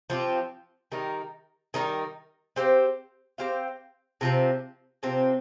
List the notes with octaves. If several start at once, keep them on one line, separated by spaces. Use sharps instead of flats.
F3 C4 G4
D#3 G3 D#4 A#4
D#3 G3 D#4 A#4
C4 G4 C5 F5
C4 G4 C5 F5
C3 F3 C4
C3 F3 C4